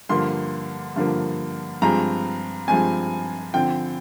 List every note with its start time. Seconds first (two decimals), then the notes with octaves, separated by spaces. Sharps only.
0.09 G2 D3 F3 A#3 C6
0.96 G2 D3 F3 A#3
1.82 G2 F3 G#3 C4 A#5
2.68 G2 F3 G#3 C4 G#5
3.54 D3 F3 C4 G5